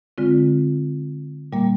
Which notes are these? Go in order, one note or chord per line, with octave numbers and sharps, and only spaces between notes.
D3 G#3 C4 F4
A#2 G3 A#3